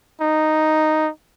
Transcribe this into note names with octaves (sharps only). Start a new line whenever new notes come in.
D#4